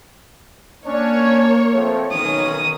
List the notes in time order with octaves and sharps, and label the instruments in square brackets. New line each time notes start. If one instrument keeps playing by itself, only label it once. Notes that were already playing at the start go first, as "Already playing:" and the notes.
[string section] A#3 C#5 [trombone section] C#4 D4
[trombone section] F3 A3 C4
[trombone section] B1 C#4 [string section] D#3 [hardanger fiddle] D#6